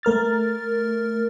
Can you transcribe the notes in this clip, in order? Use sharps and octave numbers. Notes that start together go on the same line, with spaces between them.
A3 A#4 F6 A6